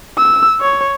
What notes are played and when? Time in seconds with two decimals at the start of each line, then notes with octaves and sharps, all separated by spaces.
0.18 E6
0.61 C#5